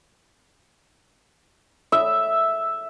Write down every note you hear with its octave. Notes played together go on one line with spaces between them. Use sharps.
E5